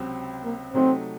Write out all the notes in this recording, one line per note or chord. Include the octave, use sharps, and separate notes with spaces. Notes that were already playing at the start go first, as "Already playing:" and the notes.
Already playing: C#2 C3 F#3 C4
A#3
C3 F#3 A3 C4 D#4